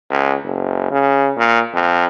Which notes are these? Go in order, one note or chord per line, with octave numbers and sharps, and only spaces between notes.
C#2
F#1
C#3
A#2
F2